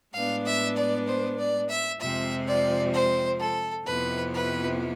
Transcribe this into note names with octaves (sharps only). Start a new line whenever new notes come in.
A2 G#3 B3 D4 F5
E5
D5
C5
D5
E5
F2 C3 F3 G#3 C4 E5
D5
C5
A4
F2 C3 F3 B3 E4 B4
B4